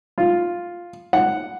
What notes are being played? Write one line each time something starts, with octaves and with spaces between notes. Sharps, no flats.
F4
F#5